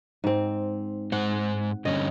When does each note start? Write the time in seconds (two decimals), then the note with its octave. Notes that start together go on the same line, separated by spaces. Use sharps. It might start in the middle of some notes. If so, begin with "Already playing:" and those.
0.24 G#2 C4
1.12 G#2 C5 F#5
1.85 G2 D3 C#4 D#5